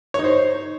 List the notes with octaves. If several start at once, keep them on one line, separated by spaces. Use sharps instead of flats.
D#4 C5 C#5